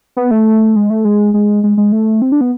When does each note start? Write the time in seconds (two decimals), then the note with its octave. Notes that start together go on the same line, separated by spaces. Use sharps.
0.17 B3
0.31 A3
0.76 G#3
0.90 A3
1.05 G#3
1.34 G#3
1.64 G#3
1.77 G#3
1.92 A3
2.22 C4
2.32 D4
2.41 B3